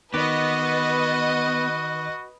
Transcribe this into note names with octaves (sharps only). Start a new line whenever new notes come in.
D#3 B3 F#4 B4 D#5 B5 D6